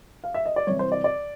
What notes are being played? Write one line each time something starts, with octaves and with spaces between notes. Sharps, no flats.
F5
E5
D#5
D5
C2 C3 E3 C#5
C5
D5
D5